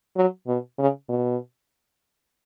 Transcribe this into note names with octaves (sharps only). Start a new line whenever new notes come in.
F#3
B2
C#3
B2